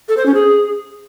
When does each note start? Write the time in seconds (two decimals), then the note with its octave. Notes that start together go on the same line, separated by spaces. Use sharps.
0.09 A4
0.17 C5
0.26 C#4
0.34 G#4